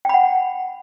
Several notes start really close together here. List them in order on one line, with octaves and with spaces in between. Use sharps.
G5 B5 F#5